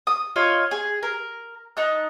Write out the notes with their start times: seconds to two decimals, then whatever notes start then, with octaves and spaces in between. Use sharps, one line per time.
0.07 D#6
0.36 F4 C#5 D#5
0.71 G#4
1.03 A#4
1.77 D#4 A5 F#6